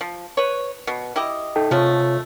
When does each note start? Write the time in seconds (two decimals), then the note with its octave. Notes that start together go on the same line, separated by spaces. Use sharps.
0.01 F3
0.37 B4 C#5
0.87 B2
1.16 E4 G4 D#5
1.56 D#4 A4 G5
1.71 C3 F3 G#3 A3 F4 C#5